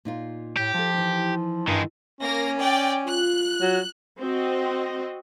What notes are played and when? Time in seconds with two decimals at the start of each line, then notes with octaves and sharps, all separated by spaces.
0.05 A#2 D#4 F4
0.57 A2 G4
0.74 F3 F4 A4
0.94 E3 D#4
1.67 G2 D#3 G#3
2.20 A#3 C#4 A#6
2.59 D5 G5
3.07 F4 F#6
3.61 F#3
4.20 C4 F#4 D#5